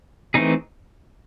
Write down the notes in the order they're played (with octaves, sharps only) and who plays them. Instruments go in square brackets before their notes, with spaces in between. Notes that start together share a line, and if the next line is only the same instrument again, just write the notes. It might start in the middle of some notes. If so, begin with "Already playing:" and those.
[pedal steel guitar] E3 A3 C4 D#4 G#4